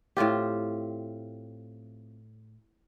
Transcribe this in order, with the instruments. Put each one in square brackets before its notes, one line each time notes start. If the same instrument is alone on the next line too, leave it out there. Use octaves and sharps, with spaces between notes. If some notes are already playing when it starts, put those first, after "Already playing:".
[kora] A2 C4 F4 G4